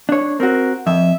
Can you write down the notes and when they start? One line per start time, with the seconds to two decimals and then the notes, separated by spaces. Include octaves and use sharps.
0.09 D4 C#5
0.40 C4 F#4 A#4
0.87 F2 E5